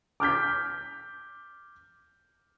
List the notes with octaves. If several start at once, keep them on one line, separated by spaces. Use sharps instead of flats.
D6 F6 G6 B6